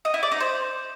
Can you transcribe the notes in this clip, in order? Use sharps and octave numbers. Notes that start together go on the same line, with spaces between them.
D#5
E4
D5
D#4
C5